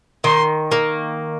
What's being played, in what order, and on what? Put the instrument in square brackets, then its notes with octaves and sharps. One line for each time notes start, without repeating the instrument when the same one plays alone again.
[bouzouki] D#3 [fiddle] C6
[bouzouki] A#3